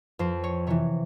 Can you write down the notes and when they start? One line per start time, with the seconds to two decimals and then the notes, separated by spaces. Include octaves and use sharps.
0.19 F2 C5
0.44 C#5
0.67 C3 E3 C#5